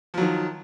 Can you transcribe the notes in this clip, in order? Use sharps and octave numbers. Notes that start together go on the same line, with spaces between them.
D#3 F3 F#3